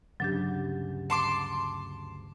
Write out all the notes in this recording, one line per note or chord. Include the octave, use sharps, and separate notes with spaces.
D2 G2 C#3 F#3 D4 G4
A5 C6 D6